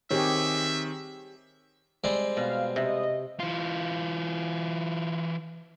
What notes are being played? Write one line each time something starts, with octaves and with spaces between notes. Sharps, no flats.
D#3 C4 G4 G#4 C#5 E5
G3 G#3 C4
B2 F5
C3 D#5
E3 F4